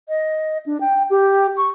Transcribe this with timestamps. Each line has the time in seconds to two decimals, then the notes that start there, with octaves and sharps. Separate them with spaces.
0.09 D#5
0.66 D4
0.81 G5
1.10 G4
1.57 C#6